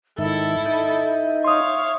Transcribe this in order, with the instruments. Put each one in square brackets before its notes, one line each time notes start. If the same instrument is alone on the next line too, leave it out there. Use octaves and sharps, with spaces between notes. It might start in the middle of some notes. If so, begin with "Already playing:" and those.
[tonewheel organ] G#2 D#3 [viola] E4 A4 [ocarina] E5
[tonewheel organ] D#4
[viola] C#5 F5 [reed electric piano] C6 D#6